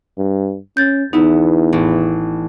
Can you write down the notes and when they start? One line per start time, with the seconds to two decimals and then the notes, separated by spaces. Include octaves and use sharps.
0.18 G2
0.77 C#4 G6 A6
1.13 E2 B3 D#4 E4
1.73 A1